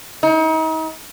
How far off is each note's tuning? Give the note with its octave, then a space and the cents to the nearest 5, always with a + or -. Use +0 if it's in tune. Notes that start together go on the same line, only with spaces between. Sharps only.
D#4 +40